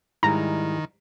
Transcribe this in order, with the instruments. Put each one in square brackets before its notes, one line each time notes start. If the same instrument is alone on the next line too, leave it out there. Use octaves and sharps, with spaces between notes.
[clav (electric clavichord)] G#2 G3 G#3 [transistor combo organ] D#3 [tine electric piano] E4 [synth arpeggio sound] A#5